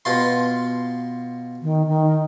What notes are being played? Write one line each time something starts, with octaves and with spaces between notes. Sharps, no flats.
B2 F4 C6
D#3
D#3